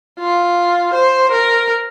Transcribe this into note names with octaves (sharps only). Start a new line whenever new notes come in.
F4
C5
A#4